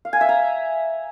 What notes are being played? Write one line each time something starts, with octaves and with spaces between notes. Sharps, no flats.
F5
G#5
E5
A#5